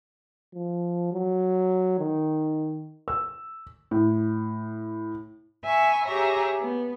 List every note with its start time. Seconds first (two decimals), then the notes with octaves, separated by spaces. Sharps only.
0.54 F3
1.13 F#3
1.99 D#3
3.08 E6
3.91 A2
5.64 E5 G#5 B5 C#6
6.05 G4 G#4 C#5 E5 A#5
6.60 B3